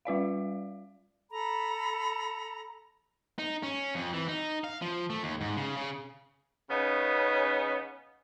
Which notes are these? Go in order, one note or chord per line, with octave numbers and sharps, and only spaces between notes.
G3 F4 D5 F5
A4 A#5 B5
D#4
C#4
F2
E3
D#4
F5
F3
A3
D#2
G#2
C#3
C#3
C#3 B3 C#4 D#4